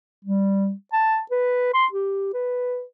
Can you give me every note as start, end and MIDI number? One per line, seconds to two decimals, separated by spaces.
0.25 0.72 55
0.93 1.20 81
1.31 1.72 71
1.73 1.86 84
1.92 2.29 67
2.34 2.83 71